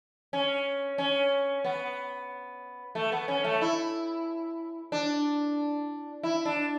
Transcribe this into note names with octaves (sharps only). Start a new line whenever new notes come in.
C#4
C#4
B3
A3
B3
C#4
A3
E4
D4
E4
D4